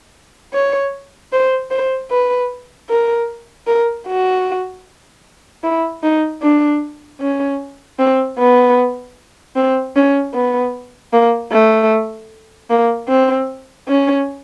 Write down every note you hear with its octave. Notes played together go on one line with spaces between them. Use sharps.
C#5
C5
C5
B4
A#4
A#4
F#4
E4
D#4
D4
C#4
C4
B3
C4
C#4
B3
A#3
A3
A#3
C4
C#4